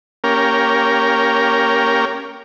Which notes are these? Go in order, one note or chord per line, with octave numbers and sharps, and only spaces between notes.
A#3 C#4 G4 A#4